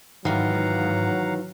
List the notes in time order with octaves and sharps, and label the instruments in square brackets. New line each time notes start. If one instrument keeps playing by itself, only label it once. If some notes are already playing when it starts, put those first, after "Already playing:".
[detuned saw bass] G#2 [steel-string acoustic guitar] D#3 E3 F4 [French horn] F#3 [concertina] F5 F#5 A#5